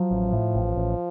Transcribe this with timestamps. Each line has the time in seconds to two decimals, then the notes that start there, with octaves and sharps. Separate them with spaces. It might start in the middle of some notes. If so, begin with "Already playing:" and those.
Already playing: F3 F#3
0.11 A1
0.33 A2
0.55 A1
0.76 A1